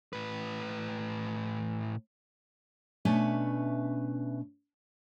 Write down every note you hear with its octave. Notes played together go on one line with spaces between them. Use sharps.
A2 B4
B2 A3 C#4 D4 B4 E5